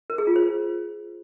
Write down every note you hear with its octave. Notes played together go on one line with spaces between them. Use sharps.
A#4
G#4
F4
C5